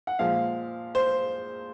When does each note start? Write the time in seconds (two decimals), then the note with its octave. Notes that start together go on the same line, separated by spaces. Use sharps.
0.07 F#5
0.19 A#2 F3 G#3 F5
0.95 C5